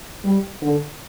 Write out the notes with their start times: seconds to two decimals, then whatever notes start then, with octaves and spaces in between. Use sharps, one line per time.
0.25 G3
0.62 D3